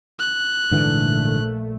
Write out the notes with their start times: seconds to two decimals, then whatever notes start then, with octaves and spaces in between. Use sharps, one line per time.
0.19 F#6
0.71 A#1 G#2 D3 E3 A3